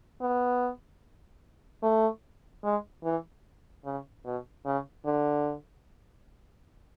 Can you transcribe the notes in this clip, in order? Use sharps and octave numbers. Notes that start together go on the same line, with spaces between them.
B3
A3
G#3
E3
C#3
B2
C#3
D3